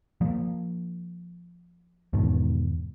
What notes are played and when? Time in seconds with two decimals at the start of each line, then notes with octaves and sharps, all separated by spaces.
0.21 F3 A#3
2.13 E2 G#2 B2 D#3